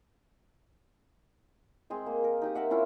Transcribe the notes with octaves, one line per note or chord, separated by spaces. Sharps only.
G#3 C4 G#4
A#3
A#4
D#4 G4 D#6
A#4 E5 F#5 D6
C4 C#4 E4 F4